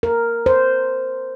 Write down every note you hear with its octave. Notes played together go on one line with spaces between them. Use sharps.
A#4
C5